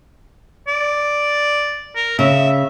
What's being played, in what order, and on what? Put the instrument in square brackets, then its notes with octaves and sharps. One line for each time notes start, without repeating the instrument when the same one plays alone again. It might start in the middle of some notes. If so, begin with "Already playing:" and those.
[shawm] D5
A#4
[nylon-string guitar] C#3 [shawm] E5